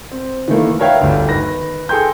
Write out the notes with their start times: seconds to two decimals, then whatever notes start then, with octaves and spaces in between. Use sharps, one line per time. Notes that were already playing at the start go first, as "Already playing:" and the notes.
0.12 C4
0.48 D#3 E3 A3 A#3
0.79 A#4 B4 C#5 E5 F5 G5
1.01 G1 D2
1.29 D#3 B4 A#6
1.89 G#4 A4 G5 C6 G6